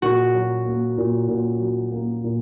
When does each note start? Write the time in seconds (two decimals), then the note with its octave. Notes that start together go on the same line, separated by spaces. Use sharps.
0.02 A#2 F#4
0.34 F#3
0.66 A#3
0.98 A#2
1.28 A#2
1.60 F#3
1.92 A#3
2.24 A#2